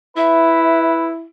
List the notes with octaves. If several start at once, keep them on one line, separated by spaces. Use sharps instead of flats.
E4 B4 E5